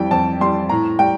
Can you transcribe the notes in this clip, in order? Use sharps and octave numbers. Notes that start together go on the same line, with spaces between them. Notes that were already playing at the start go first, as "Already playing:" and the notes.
Already playing: F2 E3 G3 G5
F2 A5
E3 G3 C6
A2 A#5
G3 G5